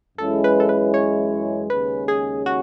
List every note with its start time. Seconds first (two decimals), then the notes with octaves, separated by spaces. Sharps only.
0.18 F#2 E3 G#3 C#4 E4 A4
0.44 B4
0.60 A4
0.69 B4
0.94 C#5
1.70 D#2 C#3 G#3 C#4 B4
2.08 G#4
2.46 F#4